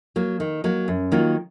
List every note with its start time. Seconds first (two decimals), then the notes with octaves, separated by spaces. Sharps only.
0.16 F#3 A#3
0.40 D#3
0.64 F#3 A#3
0.88 F#2
1.12 D#3 F#3 A#3 F4